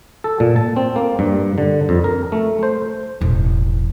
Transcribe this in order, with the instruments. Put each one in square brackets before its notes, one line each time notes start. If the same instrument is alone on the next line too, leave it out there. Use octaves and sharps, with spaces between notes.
[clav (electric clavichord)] A4
A#2
A5
C4
A#3
G2
D3
F2
A#4
A3
C5
[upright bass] E1 A1